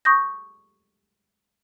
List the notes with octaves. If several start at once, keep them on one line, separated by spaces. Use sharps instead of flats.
C#6 D#6 G6 A#6